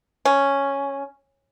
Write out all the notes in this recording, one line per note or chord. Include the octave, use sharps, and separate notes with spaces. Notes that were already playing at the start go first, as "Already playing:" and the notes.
C#4